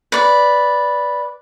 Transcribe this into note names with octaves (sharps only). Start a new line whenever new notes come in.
B4 D5